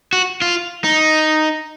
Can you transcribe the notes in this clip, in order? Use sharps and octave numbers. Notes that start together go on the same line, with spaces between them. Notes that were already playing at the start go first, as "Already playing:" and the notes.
F#4
F4
D#4